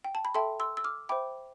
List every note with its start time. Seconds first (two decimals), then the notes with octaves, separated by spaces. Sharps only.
0.05 G5
0.15 A5
0.25 B5
0.34 A4 E5 G5 A5 C6
0.60 C6 E6
0.77 E6
0.84 D6 F6
1.09 C5 E5 G5 B5 D6